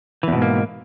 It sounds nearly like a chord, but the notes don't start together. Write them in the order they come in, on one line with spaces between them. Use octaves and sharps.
E3 E2 B2 G#2 A#3